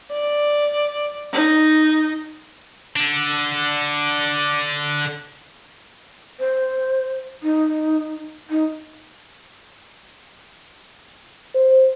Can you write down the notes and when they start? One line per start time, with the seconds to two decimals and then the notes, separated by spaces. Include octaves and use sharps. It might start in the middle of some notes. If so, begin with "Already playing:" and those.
0.11 D5
1.32 D#4
2.96 D3 D4
6.40 C5
7.43 D#4
8.50 D#4
11.55 C5